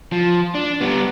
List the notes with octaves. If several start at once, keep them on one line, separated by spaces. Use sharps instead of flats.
F3
D4
G3 B3